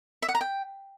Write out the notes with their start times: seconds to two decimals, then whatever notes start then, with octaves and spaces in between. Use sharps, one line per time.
0.22 E5
0.28 F#5
0.35 A#5
0.41 G5